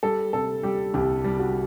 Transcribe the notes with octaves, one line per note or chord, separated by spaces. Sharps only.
G3 A4
C3 A4
G3 G4
C2 G4
G3
F#4